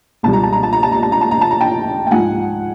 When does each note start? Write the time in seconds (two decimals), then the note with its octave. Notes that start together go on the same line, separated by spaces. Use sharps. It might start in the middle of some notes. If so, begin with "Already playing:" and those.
0.23 C#2 B2 G3 A5
0.33 A#5
0.43 A5
0.53 A#5
0.63 A5
0.73 A#5
0.83 A5
0.92 A#5
1.03 A5
1.12 A#5
1.21 A5
1.31 A#5
1.41 A5
1.51 A#5
1.61 G5 A5
2.07 G5
2.11 G#2 F3 F#5 G#5